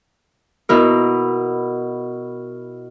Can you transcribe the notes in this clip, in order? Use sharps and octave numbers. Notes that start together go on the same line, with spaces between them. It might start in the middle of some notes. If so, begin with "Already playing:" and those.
B2 E4 A#4